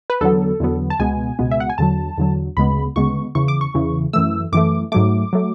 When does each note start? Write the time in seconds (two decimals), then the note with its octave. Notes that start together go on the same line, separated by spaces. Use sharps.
0.10 B4
0.21 E2 D3 F#3 B3 A4
0.60 E2 D3 F#3 B3
0.90 A5
0.99 C#2 B2 G#3 B3 G#5
1.39 C#2 B2 G#3 B3
1.51 E5
1.60 F#5
1.70 G#5
1.78 E2 D3 F#3 A5
2.18 E2 D3 F#3
2.57 D2 C#3 G#3 B3 B5
2.96 D2 C#3 G#3 B3 C#6
3.35 E2 C#3 E3 C#6
3.48 D6
3.61 C#6
3.74 E2 C#3 E3
4.13 F#2 E3 A3 E6
4.52 F#2 E3 A3 D6
4.92 G#2 F#3 A3 D6
5.33 F#3 A3